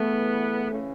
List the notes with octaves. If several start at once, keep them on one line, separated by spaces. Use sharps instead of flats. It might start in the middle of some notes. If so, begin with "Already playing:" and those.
Already playing: E2 E3 A3 B3
C#3 E3 C#4